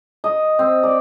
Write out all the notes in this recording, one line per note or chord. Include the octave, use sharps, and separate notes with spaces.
D#5
C4
D5